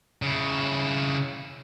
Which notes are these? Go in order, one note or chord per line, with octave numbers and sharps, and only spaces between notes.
C#3 E4